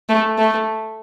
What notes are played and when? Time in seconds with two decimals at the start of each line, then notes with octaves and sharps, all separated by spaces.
0.09 A3
0.38 A3